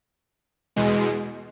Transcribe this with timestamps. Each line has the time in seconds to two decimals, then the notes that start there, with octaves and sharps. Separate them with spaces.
0.76 E2 B2 G#3